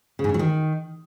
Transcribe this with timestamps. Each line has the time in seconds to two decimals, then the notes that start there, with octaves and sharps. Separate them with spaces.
0.19 C#3
0.24 G#2
0.29 C#3
0.34 F#3
0.39 D#3